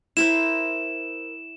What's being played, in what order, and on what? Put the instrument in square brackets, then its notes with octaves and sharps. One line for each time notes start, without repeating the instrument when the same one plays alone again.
[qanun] E4 A#4 C5 [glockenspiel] E7